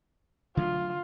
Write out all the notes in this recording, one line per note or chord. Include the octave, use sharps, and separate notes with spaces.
D3 F#3 A3 F4